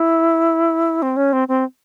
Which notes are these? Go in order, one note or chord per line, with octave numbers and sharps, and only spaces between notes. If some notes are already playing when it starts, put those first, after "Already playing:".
Already playing: E4
C4
C#4
C4
C4